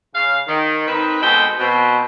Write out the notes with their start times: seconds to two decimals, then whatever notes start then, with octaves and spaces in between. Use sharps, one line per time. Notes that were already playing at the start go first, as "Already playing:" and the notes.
0.15 C#3 F5
0.48 D#3
0.88 C4 D#4 A#4 B4
1.22 B2 G#3 C4 A4 G5 B5
1.59 B2 C4